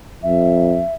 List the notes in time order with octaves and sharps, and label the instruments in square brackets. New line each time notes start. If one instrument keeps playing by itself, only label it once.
[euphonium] F2 [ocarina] E5